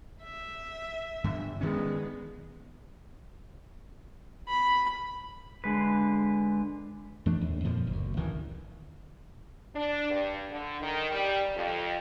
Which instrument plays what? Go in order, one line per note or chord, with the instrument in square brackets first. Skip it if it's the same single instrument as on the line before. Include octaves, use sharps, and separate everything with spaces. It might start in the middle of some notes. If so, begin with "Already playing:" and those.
[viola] E5
[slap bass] G2 D3
[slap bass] D#3 C#4 [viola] G#3 B3
[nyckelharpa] B5
[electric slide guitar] D3 G#3 B4
[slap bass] F2 E3 A3 D4
D#2
F2 A#2 D3 F3
F#1 D2
A1 D2 D#3 E3
[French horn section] D4
G2
D3
D#3
G3
F2